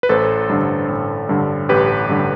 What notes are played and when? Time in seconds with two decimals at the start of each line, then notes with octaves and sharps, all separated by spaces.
0.03 B4
0.09 A1 A4 C5
0.49 G2 D3
0.89 A1
1.29 G2 D3
1.69 A1 G4 B4
2.09 G2 D3